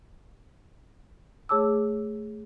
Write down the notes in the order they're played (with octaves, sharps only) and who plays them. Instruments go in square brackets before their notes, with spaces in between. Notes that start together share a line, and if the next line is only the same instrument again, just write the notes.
[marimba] A3 G#4 C#5 A5 D6 E6